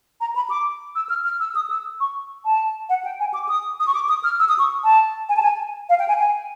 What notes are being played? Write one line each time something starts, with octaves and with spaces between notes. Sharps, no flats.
A#5
B5
D6
E6
F6
F6
E6
D#6
E6
C#6
A5
F#5
G5
G#5
D6
D#6
D#6
C#6
D6
D#6
F6
E6
D#6
C#6
A5
G#5
A5
G#5
F5
G5
G#5
G#5